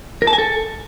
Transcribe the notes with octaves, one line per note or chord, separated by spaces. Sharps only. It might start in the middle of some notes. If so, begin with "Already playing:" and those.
A#4
A5
G#5
A4